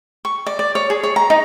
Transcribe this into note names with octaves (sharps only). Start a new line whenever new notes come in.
C#6
D5
D5
C#5
G#4
C#5
A#5
D#4